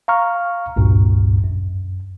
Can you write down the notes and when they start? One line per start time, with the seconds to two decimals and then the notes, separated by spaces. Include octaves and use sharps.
0.08 F5 A#5 C#6 F6
0.76 G#1 C#2 G2 A#2
1.44 F#2